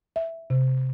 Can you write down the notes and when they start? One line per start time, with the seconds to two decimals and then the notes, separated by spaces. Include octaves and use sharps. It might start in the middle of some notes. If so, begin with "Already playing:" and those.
0.16 E5
0.50 C3